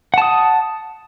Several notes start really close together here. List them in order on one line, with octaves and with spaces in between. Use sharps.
F#5 A5 D#6